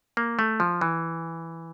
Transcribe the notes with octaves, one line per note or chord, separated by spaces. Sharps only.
A#3
A3
F3
E3